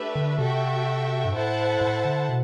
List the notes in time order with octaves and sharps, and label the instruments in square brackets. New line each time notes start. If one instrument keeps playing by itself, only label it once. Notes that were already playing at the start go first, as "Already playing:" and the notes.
Already playing: [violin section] A3 D4 G4 B4 E5
[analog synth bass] D3
[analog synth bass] C3 [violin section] F#4 A4 E5 G5
[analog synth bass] G2
[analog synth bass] A2 [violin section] E4 A4 C5 F#5 A5
[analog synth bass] A2
D3
B2